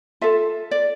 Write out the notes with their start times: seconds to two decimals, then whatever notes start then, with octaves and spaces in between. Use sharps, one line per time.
0.21 F4 A4 E5
0.71 D5